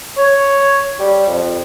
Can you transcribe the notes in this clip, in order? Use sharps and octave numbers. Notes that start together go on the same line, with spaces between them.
C#5
G3
F2